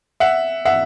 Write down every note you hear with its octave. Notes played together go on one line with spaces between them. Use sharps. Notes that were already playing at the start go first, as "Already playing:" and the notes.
E5 F#5
E5 F#5